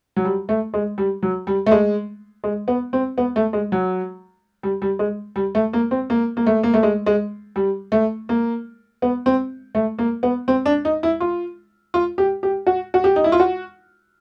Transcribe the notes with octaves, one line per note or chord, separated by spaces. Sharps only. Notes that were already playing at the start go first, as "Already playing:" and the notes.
F#3
G3
A3
G#3
G3
F#3
G3
A3
G#3
G#3
B3
C4
B3
A3
G#3
F#3
G3
G3
G#3
G3
A3
A#3
C4
A#3
A#3
A3
A#3
A3
G#3
G#3
G3
A3
A#3
B3
C4
A3
A#3
B3
C4
D4
D#4
E4
F4
F4
G4
G4
F#4
F#4
G4
D#4
E4
F4
F#4